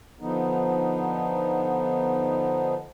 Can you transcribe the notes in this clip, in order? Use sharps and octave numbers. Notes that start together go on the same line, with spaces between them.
D3 F3 B3 D#4